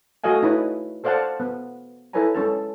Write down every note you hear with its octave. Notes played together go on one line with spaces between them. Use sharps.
A3 F#4 A4 D#5 F5 G#5
D#4 E4 B4 C#5
A4 C5 D5 F5 F#5 A5
B3
E4 A4 B4 C#5 G#5 A#5
G#3 C#4 A4 A5